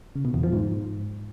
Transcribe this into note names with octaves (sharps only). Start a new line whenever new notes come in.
C#3
B2
E2
F3
G#2